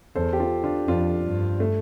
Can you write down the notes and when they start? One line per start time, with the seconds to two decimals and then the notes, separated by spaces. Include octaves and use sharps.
0.15 E2 A4 C5
0.33 G4
0.40 F4 A4
0.64 D4 F4
0.88 F2 D4 F4
1.23 G2
1.60 A3